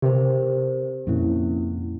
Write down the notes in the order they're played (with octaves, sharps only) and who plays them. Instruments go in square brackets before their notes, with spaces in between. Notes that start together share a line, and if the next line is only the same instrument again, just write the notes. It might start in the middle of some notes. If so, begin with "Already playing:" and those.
[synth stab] C3 [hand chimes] G4 A#4 C5
[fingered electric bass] F2 A#2 [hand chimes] C4 C#4 E4